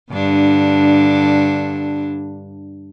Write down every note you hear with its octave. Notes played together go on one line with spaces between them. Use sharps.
G2 D3 D4